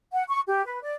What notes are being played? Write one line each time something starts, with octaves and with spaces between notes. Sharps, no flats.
F#5
C#6
G4
B4
D5